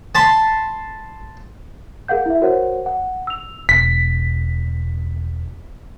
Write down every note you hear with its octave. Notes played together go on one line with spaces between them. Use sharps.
A5 B5 C6
G#4 A#4 F5 F#5 G6
E4 E5
F#4 A#4 C5 C#5 F#5
F#5
E6 F7
E1 B6